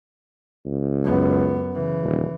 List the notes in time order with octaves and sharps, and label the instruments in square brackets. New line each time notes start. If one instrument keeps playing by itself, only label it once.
[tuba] C#2
[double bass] F#2 B3
C#3 E3
[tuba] D#1